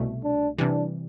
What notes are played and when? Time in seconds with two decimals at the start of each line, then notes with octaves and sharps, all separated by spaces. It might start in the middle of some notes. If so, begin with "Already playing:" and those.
Already playing: C2 B2 A3
0.23 D4
0.59 C3 E3 G3 D4